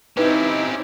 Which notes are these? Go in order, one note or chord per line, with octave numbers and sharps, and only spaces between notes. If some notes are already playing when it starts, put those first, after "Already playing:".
C4 C#4 D#4 E4 G4 B4